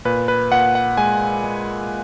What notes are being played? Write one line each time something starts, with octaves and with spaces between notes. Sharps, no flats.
A#2 B4
B4
A#2 F#5
F#5
G#3 G#5
G#3